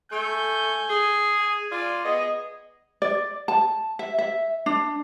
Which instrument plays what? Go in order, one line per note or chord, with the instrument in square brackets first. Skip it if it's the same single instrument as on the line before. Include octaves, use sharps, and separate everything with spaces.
[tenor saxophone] A3 [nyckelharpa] G#5 [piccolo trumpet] G6
[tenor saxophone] G#4
[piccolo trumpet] G#5
[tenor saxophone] F4 [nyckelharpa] D5
[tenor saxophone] B3 [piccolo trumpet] G#4 [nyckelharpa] D#5
[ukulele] D5
A5
E5
E5
D4